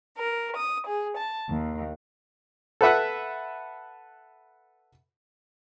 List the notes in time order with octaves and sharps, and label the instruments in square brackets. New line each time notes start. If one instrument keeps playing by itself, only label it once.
[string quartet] A#4
D#6
G#4
A5
D#2
[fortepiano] A4 B4 E5 F#5